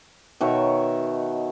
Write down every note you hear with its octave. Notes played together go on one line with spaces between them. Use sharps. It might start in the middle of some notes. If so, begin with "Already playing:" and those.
B2 D#3 C#5 E5